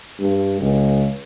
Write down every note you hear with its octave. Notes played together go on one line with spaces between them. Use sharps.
G2
C#2